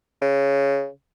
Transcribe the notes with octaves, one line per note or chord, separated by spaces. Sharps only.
C#3